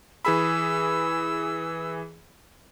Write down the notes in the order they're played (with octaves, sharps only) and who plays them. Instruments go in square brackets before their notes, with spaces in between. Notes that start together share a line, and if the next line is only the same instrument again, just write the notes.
[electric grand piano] E3 G#4 B5 [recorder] E6